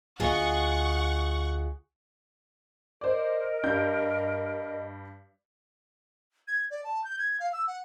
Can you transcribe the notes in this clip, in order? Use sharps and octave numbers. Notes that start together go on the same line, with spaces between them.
D2 A#3 F4 G#4 D#5 F#5 C#6
A#4 C5 D5 D#5
G2 G3 G6
G#6
D5
A5
G6
G#6
F5
E6
F#5